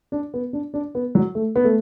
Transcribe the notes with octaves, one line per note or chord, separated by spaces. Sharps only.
D4
B3
D4
D4
B3
F#3
A3
B3
A3